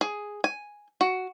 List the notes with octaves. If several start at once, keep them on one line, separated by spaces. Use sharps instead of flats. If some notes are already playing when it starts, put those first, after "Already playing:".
G#4
G#5
F#4